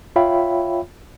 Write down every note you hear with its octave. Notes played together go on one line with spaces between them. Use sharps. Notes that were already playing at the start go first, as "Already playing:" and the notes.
F4 C#5 E5 F5 G5 B5